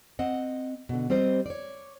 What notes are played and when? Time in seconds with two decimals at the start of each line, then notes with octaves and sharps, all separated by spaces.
0.19 C4 D#5 F#5
0.89 B2 D3
1.10 G3 C4 G4 C5 D#5
1.46 C#5 D5